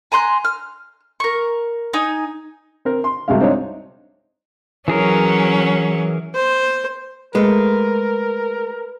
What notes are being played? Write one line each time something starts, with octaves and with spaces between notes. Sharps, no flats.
G#5 A#5 C6 F#6
F6
A#4 C#6
D#4 G#5
C4 A#4
C6
C2 C3 F#3 G#3 F5
C4 D4 D#4 C#5
E3 F#3 C#4 G#4 A#4
C5
G#3 A3 A#4 B4